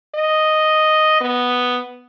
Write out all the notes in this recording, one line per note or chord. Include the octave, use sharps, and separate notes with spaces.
D#5
B3